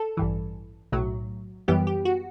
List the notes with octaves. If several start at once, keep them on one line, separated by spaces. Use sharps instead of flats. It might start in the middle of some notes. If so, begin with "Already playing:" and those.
Already playing: A4
A1 G2 E3
B1 A2 F#3
F#2 E3 G3 B3 G4
G4
F#4